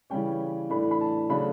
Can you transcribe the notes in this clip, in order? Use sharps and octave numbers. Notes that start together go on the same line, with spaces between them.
C#3 E3 G3 C#4 G5
A2 E3 A3 D4 B5
B5
A5
C#3 F#3 A3 D4 B5